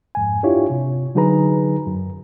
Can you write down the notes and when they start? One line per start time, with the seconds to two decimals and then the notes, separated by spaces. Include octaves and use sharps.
0.15 F2 G#2 G#5
0.43 D4 E4 F4 G4 C#5
0.70 C3
1.15 D3 F#3 D#4 G#4 B4 A#5
1.87 F#2